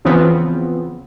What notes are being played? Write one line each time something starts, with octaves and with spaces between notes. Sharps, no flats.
E2 C#3 F3 B3 C4